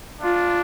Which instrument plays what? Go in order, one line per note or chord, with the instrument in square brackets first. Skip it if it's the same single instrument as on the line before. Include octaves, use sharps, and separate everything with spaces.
[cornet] D4 [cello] F4